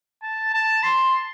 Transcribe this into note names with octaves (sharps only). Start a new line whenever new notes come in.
A5
A5
C6